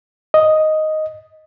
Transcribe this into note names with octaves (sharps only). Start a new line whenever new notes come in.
D#5